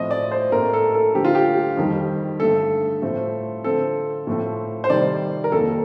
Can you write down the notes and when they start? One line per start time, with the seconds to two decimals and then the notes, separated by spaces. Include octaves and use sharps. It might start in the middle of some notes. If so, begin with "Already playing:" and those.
Already playing: A2 F3 C4 D#5
0.11 D5
0.31 C5
0.52 A2 A3 C4 A#4
0.73 A4
0.94 A4
1.15 D3 F3 A3 G4
1.25 F4
1.35 G4
1.77 F2 D#3 G3
2.40 G2 D3 A3 A4
3.02 A2 F3 A3 C4
3.64 D3 F3 C4 A4
4.27 A2 F3 A3 C4
4.84 C5
4.90 C3 D#3 G3 D5
5.44 A#4
5.52 F2 D#3 A#3 A4